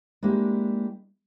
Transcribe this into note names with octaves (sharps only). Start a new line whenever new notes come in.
G#3 A#3 D4 E4 G4